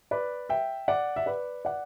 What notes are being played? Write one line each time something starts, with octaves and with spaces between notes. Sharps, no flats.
B4 D5
E5 G5
D5 F#5
E5
B4 D5
D5 F#5